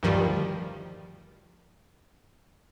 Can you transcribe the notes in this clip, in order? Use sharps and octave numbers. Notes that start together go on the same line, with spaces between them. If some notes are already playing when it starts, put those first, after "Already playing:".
D2 G2 D#3 F3 G3